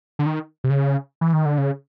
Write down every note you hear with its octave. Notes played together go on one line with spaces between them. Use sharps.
D3
D#3
C3
C#3
E3
D#3
D3
C#3